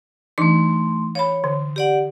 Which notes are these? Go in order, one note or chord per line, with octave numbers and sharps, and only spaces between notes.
E3 A3 D4 D#4 C6
C#5 F5 B5
D3
G4 D5 F#5